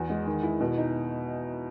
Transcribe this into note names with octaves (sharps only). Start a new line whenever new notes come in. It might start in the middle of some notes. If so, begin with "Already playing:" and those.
Already playing: E2 F#4
G#3
D#3
E4
B2
D#4